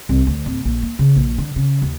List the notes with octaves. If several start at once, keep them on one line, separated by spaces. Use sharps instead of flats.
C2
D2
D1
A#1
A#3
C#3
A#1
D3
C#3
D#2